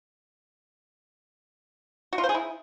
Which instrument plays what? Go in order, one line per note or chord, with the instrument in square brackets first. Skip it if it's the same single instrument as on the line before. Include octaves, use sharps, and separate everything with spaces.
[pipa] F#4
F4
C5
G#4
E4